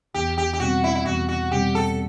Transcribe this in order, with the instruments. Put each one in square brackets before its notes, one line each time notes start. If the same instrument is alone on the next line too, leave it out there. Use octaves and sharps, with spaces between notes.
[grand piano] E2 [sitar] G4
[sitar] G4
G4
[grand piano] B2 G3 C4 [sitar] F#4
[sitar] E4
E4
[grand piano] E2 [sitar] F#4
[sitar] F#4
[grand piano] B2 G3 C4 [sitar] G4
[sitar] A4